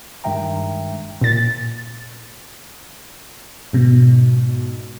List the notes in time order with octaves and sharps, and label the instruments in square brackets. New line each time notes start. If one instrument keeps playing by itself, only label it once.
[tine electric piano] G2 D#3 G#3 E5 G5 A#5
[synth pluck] A#2 A6
[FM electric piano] G#2 B2